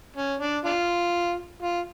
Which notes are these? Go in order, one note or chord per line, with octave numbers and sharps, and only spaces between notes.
C#4
D4
D4 F4
F4